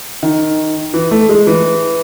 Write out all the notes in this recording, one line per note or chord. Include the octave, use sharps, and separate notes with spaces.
D#3
E3
A3
G#3
E3